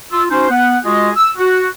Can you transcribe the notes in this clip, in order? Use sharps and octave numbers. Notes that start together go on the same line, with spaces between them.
F4 E6
C#4 D#4 F#4 C5
B3 F#5
G#3 F4 F#4 G#4 D#5
E6
F#4